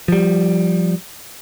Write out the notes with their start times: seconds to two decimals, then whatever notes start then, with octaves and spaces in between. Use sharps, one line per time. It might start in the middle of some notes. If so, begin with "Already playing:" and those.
0.08 F3 G3